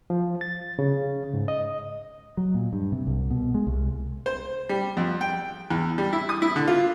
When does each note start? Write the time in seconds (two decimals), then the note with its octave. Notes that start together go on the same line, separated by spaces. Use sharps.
0.10 F3
0.41 A6
0.79 C#3
1.34 G#2
1.48 D#5
2.37 F#3
2.54 A#2
2.73 G2
2.92 C3
3.07 C2
3.31 B2
3.54 G#3
3.67 C2
4.26 C5
4.69 G3
4.97 F2
5.21 G5
5.70 E2
5.98 G3
6.13 E4
6.29 D#6
6.42 E4
6.56 D3
6.67 F4